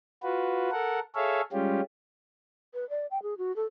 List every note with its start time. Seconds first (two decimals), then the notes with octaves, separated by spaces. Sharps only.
0.23 F4 F#4 B4
0.72 A4 A#4 F#5
1.15 G#4 A4 C#5 E5 F5
1.52 G3 G#3 C#4 F4 G4
2.74 B4
2.90 D5
3.11 G5
3.23 G#4
3.38 F#4
3.56 A4